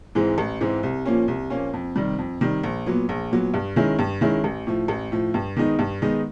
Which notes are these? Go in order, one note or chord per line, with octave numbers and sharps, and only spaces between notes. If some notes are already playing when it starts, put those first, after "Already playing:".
G#2 E3 G#3 C4
A1
G#2 E3 G#3 C4
C2
A#2 F3 A#3 C#4
C2
A#2 F3 A#3 C#4
F2
C3 D#3 G3
F2
C3 D#3 G3
A#1
A#2 F#3 B3
A#1
A#2 F#3 B3
G2
D#3 G#3 C#4 E4
G2
D#3 G#3 C#4 E4
A1
A2 F3
A1
A2 F3
G2
D#3 G#3 B3 D#4
G2
D#3 G#3 B3 D#4